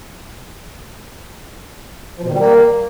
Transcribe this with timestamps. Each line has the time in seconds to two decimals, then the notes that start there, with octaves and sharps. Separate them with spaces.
2.18 F3
2.23 B2
2.28 D#3
2.33 G3
2.39 A#3